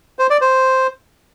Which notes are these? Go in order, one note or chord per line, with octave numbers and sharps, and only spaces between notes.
C5
D5
C5